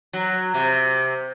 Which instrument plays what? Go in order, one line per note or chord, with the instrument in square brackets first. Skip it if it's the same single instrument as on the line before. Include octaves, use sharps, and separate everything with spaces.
[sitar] F#3
C3